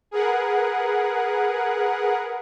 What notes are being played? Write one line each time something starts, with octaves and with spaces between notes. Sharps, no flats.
G#4 A#4 B4 F#5